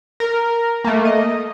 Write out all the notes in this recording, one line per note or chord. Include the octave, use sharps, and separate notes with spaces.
A#4
A3 A#3
D#5